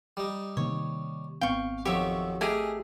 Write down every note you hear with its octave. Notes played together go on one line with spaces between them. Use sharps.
G3 D#4
C3 D#3 A#3 C#5
G#1 B3 C4 F5 G5 C#6
F2 D#3 F#3 G4 C#5 E5
A3 G4 G#4 A#4 D#5 G#5